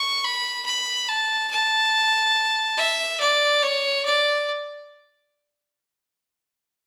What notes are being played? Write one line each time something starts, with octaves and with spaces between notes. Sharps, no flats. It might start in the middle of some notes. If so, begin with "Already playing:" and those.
Already playing: C#6
B5
B5
A5
A5
E5
D5
C#5
D5